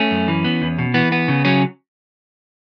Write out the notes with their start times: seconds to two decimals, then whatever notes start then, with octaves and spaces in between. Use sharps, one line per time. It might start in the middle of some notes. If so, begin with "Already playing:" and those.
Already playing: A3 C#4
0.11 F#2
0.28 E3
0.45 B3
0.62 E2
0.79 B2
0.94 E3 B3
1.12 B3
1.28 C#3
1.45 F#3 C#4